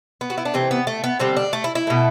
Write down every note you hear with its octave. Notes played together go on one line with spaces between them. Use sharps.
B3
F#4
E4
D4
C3 E3 A3 C4
B3
A3
B3
D3 G3 C4
D4
A3
E4
E4
B2 A3